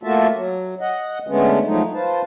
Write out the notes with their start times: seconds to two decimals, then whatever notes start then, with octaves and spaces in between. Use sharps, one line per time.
0.03 A3 A#3 F4 F#4 E5 A5
0.35 F#3
0.81 D#5 F#5
1.27 D3 G#3 A3 B3 C#4
1.65 F3 F#3 G#3 A3 D#4
1.94 F4 B4 C5 A5